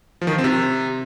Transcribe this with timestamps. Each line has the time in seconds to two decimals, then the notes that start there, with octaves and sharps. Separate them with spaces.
0.21 F3
0.27 D#3
0.33 F3
0.38 C4
0.44 C3